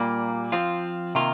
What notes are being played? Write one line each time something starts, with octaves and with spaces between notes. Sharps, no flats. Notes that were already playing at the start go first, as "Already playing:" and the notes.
Already playing: A#2 G3 A#3
F3 C4 F4
C3 D#3 A#3 F4